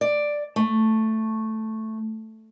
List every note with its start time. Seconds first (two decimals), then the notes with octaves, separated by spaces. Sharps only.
0.01 D5
0.56 A3